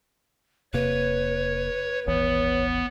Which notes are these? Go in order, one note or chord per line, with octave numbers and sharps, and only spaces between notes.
E1 C3 A#3 B4 C#5
D#1 G#1 E3 B3 C#5